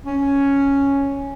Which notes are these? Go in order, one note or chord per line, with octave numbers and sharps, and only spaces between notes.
C#4